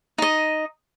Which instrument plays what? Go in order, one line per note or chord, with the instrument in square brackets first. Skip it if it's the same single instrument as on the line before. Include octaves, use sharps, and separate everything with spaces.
[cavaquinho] D#4 D#5